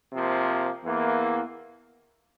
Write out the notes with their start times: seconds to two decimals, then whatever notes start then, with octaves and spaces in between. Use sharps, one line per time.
0.12 C3 F3 A#3
0.84 E2 E3 A#3